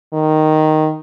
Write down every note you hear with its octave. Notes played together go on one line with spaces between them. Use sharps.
D#3